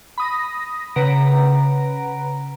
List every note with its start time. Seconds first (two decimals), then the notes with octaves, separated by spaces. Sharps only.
0.18 B5 D#6 A#6
0.96 C#3 B4 F#5 A#5 D7